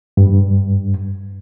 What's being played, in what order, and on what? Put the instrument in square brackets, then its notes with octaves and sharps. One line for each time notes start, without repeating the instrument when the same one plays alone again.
[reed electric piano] G2